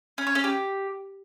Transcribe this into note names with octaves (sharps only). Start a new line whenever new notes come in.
C#4
C#5
C#4
G4